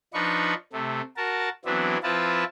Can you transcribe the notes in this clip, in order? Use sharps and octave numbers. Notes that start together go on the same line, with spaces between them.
F3 D4 D#4 B4 C#6
C3 A3
F#4 A#4 A5
E3 F#3 B3 C4 D4 E4
F3 C4 E4 F4 B4 A5